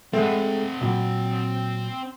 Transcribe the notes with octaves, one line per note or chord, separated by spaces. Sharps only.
G#3 A3 C4 F#5
A#2 F#3